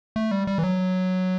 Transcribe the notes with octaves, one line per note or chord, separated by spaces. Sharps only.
A3
G3
G3
E3
F#3